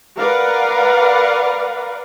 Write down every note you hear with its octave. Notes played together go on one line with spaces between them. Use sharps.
A#4 B4 D5 F5 F#5